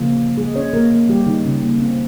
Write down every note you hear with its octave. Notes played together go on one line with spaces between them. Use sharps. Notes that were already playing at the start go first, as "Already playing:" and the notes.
Already playing: C#3 F3 A#3
G#3 G#4
C#4 C#5
A#3 A#4
D#3 A#3
G3 G4
D#3 D#4
C#3 C#4
A#3
C4